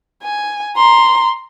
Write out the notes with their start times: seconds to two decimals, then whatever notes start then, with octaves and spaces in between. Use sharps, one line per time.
0.23 G#5
0.77 A#5 C6